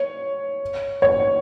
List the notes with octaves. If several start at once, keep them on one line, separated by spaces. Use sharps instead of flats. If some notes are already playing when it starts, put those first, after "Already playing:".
Already playing: C#5
C#5